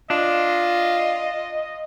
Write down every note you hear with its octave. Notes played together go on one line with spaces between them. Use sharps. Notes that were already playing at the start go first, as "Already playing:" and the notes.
D4 F4 D#5